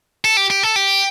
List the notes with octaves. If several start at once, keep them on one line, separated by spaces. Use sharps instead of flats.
A4
G4
G4
A4
G4